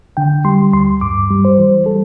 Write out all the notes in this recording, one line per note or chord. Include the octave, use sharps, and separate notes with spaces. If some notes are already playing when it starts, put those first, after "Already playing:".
D3 G5
G3 C6
D2 C6
G2 D6
G3
C5
E3
G3 A4